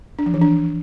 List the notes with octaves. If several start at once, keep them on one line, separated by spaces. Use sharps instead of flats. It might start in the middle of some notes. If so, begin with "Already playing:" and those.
D4
F3
E3
D4